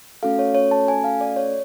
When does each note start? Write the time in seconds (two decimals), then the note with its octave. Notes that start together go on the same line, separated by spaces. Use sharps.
0.23 A3 C#4 F#4 A4 F5
0.39 C#5
0.55 C#5
0.71 A5
0.88 G#5
1.04 F5
1.21 D5
1.36 C#5